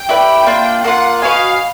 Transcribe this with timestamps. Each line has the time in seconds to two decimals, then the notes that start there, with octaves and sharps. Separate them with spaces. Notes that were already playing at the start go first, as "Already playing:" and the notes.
Already playing: G5
0.09 E4 G4 B4 D5
0.46 A#3 D4 F4
0.84 A#3 D4 F4 F#5
1.21 F#4 B4 D#5 F5 G#5